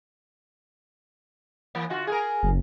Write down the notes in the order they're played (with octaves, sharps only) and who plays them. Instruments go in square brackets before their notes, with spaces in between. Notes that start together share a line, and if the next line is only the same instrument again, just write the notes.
[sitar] E3 A#3
D3 F4 F#4
G#4 A#4
[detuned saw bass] F#1